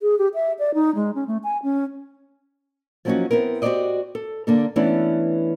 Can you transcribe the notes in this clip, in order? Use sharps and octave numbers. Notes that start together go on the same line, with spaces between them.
G#4
G4
E5
D5
D#4
G#3
C#4
A3
G#5
C#4
F3 F#3 A#3 C#4 D#4 F#4
B3 C4 E4 A#4
F#4 G4 A4 C5 D5 D#5
A4
D3 A#3 A4
E3 A3 B3 C#4 D4 E4